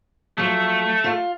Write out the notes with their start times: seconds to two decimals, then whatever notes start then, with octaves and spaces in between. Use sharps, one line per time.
0.38 F3 F#3 A3
1.04 F4